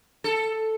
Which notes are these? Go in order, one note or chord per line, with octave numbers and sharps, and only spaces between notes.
A4